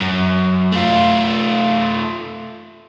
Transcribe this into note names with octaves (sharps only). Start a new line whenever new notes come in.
F#2
A3 F4